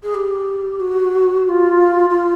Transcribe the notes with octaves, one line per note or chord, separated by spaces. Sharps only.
G#4
G4
F#4
F#4
F4
F4